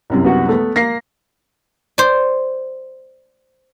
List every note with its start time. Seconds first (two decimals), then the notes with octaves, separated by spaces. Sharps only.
0.10 C2 F#2 C3
0.25 B3 F#4 F#5
0.49 A3 B3
0.76 A#3 A#6 C7
1.98 C5 D5